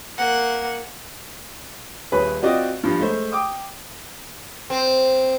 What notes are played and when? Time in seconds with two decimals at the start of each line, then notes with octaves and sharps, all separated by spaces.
0.18 A#3 F#5
2.12 D#1 G#4 B4 C#5 B5
2.43 C4 F4 F#4 D5 D#5
2.83 G2 F3
2.99 G#3 A3 C5
3.32 G5 D6 D#6
4.70 C4